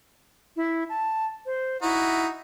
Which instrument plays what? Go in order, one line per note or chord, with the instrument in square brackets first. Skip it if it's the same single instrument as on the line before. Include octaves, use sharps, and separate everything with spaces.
[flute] E4
A5
C5
[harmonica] D#4 F#4 [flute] E4